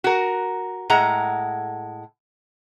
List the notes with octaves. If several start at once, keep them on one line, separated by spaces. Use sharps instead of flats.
F#4 A#4
A2 G#3 F#5 A#5